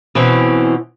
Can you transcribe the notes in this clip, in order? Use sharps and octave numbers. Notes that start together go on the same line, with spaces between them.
B2 E3 C4 C#4